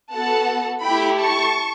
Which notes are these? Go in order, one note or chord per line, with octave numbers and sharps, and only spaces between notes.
B3 F#4 A4 F#5 A5
A3 E4 G4 G5 B5
A5 C#6